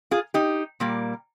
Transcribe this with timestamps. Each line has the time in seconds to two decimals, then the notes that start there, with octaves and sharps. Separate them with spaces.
0.11 F4 G#4
0.34 D#4 G4
0.80 A#2 G3 A#3